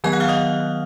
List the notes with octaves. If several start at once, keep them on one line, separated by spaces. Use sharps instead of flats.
D#3 F#3 B3 G#5 G#6
F#5 F#6
F5 F6
D#5 D#6